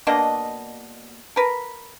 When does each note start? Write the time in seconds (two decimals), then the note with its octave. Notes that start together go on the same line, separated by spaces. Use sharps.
0.07 B2 A#3 D4 D#5
1.36 A#4 B4